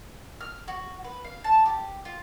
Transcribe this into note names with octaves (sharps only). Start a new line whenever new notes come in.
F6
F#4
B4
F5
A5
G4
F4